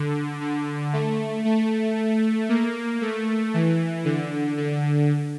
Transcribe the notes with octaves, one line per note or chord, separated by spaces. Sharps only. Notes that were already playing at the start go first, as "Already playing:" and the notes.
Already playing: D3
D3
A3
A3
A#3
A3
E3
D3
D3